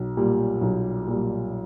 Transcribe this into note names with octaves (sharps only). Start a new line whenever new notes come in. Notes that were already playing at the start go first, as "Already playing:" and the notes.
Already playing: B1
A#2 G3
B1
A#2 G3